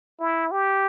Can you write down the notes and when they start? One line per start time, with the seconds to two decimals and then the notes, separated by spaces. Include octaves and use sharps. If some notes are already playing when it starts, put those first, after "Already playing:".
0.20 E4
0.51 G4